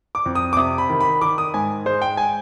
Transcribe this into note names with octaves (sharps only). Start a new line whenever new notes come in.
D6
F2
D#6
D6
C3 D#6
B5
D#3
B5
D#3 D6
D#6
G#2 G#5
G#3 C5
G5
G#5